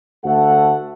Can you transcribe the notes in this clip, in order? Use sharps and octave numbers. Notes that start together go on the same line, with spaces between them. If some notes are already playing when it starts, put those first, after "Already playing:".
D2 A3 A4 F#5